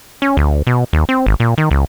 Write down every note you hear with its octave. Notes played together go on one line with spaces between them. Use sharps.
C#4
D2
B2
D#2
C4
G#1
A#2
D#3
C#2